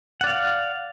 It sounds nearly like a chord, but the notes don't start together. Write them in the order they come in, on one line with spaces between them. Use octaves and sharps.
F#5 D5 F5